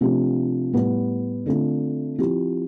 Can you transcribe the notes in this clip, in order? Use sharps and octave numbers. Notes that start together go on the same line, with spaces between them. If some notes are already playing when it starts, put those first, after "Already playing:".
C3 F3 A3 D4 G4
A2 G3 B3
D3 A3 C4 F4 A4
F3 C4 E4 G4